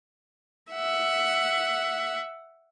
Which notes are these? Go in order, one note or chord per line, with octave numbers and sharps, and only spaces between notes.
E5 F#5